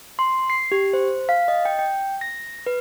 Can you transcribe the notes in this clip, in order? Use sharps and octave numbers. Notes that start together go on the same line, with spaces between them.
C6
C7
G4
C5
F5
D#5
G5
G5
A#6
B4